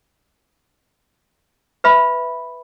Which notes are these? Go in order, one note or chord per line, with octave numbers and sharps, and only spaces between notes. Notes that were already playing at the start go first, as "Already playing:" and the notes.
B4 E5 B5